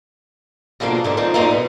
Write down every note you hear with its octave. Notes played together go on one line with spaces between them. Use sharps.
B2 D3 F3 G#3 A#3 D4
G#2 D3 A3
D#3 F3 C4 D#4
F#2 A#2 D3 A#3 C4 D#4
B2